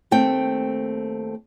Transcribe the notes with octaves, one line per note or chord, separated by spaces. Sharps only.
D#2 A3 C4 G5